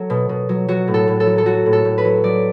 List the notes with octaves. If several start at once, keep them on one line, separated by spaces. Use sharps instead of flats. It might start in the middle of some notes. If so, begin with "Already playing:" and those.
Already playing: F#3 A4
B2
B2
F#3
F#3 F#4
A2
A4
A2
A4
F#3
A4
F#3 F#4
A2
A4
A2
B4
F#3
F#3 D5